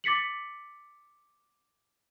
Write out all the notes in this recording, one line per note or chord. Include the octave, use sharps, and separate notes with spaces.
D6 A6 B6 C#7 F#7